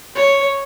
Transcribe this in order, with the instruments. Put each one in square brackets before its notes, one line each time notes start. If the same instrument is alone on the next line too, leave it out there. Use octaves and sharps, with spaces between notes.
[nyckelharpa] C#5